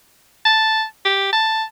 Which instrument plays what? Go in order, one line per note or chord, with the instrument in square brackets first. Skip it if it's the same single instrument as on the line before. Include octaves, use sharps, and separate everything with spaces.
[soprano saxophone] A5
G4
A5